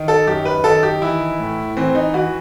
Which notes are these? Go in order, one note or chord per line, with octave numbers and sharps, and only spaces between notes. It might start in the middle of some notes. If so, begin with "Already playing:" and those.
Already playing: D#3
A4
F#2 G4
B4
D#3 A4
G4
E3 E4
A2
E3 C4
D#4
E3 F#4